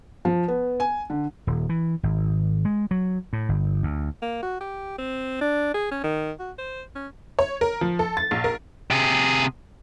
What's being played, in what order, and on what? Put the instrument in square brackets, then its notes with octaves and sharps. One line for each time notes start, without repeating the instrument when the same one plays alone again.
[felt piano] F3
B3
G#5
D3
[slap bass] D#1
E3
G#1
G#3
F#3
A2
G1
D2
[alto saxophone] A#3
F#4
G4
C4
D4
G#4
C#4
D#3
F#4
C5
C#4
[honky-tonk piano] C#5
A#4
F3
A4
A6
A#1
A#4
[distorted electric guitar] C3 G#4